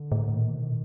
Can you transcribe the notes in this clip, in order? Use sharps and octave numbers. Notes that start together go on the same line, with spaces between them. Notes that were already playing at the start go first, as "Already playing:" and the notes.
Already playing: D3
A2
A#2 D#3
B2